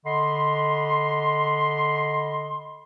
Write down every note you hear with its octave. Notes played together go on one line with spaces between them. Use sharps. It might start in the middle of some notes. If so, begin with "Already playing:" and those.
D3 D#5 B5 C6